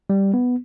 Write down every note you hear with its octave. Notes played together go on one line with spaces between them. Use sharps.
G3
B3